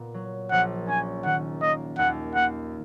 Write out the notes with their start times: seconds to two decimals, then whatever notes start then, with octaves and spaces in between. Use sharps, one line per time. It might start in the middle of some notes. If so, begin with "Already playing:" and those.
Already playing: A#2 B3
0.14 F#3
0.51 A#1 F#5
0.88 C#4 G#5
1.25 D#3 F#5
1.62 A#3 D#5
1.98 D#2 F#5
2.35 A#3 F#5